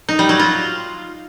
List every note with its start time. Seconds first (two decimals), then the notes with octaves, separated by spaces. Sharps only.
0.09 D#4
0.19 G3
0.29 F#3
0.39 F4